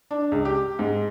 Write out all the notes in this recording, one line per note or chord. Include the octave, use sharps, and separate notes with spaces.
D4
C#2
G4
G#2